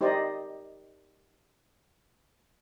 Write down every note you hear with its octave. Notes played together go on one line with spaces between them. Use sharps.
D#4 G4 C5 D5 D#5